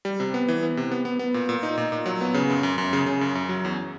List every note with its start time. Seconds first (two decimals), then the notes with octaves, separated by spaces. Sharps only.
0.05 G3
0.20 C3
0.34 B3
0.48 E3
0.63 B3
0.77 C3
0.92 B3
1.05 B3
1.19 B3
1.34 A#2
1.49 A#2
1.63 D#4
1.78 A#2
1.92 A#2
2.06 F#3
2.21 B3
2.34 C#3
2.50 F#2
2.63 F#2
2.78 F#2
2.93 C#3
3.06 C#3
3.21 F#2
3.35 F#2
3.49 F#3
3.65 E2